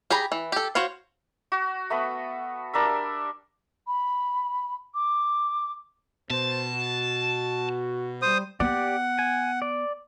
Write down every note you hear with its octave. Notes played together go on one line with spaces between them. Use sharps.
G4 G#4 A#5 B5
E3
G4 A4
F#4 C5 C#5 F5
F#4
A3 B3 B5
G3 D4 A#4 E5
B5
D6
B2 C5 A5
F#4
G3 C5 D#6
B3 G4 D5 F#5
G#5
D5